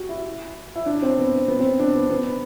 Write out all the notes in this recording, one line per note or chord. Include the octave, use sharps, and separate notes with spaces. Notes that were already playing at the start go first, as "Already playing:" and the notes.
Already playing: F#4 G4
E4
E4
D4
C4
B3
B3
C4
D4
B3
B3